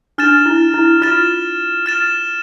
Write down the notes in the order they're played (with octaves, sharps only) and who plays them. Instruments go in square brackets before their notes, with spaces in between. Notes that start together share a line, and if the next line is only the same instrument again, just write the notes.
[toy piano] D4 [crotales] F6 A6 E7
[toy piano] E4
E4
[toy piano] F4 [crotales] F6 A6 E7
[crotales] F6 A6 E7